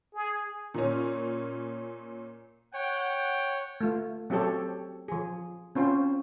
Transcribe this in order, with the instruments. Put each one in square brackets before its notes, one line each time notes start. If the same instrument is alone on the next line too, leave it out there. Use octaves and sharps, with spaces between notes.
[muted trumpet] G#4
[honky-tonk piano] A#2 C#4
[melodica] C#5 [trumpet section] F#5 G5
[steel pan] A3 F4
F#3 C4 F#4 G4 A4 C#5
F3 G#4
C4 C#4 F4 C5